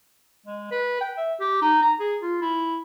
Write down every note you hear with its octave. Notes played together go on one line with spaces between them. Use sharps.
G#3
B4
G5
E5
G4
D#4
A#5
G#4
F4
E4